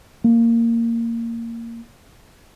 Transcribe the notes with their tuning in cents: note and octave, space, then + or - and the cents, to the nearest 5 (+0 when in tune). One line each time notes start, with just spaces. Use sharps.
A#3 -15